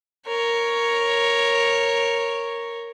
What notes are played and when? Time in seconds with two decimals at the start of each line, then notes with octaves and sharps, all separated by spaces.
0.27 A#4 C#5